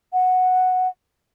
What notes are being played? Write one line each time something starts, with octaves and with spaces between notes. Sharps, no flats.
F#5